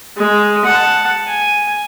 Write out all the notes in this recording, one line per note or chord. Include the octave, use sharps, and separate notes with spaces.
G#3
F#5 A5
G#5